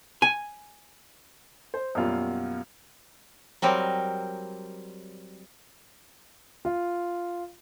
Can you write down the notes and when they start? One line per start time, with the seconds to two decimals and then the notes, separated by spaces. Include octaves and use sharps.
0.22 G#5
1.74 C5
1.95 F#2 B2 G3 A#3 F4
3.62 F#3 G3 C4 A#4
6.65 F4